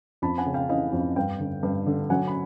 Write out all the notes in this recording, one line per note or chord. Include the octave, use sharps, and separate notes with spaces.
F2 A5 B5
F#5 G#5
C#3
F5 G5
E3 D#5 F5
F2
G2 F5 G5
D3
G2
D3
F#3 F#5 G#5
B5